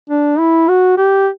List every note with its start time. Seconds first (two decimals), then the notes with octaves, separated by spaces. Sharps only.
0.10 D4
0.39 E4
0.68 F#4
0.98 G4